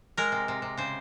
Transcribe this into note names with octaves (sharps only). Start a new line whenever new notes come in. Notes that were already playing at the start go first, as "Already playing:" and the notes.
G#3 A#4
C3
C3
C3
C#3 C5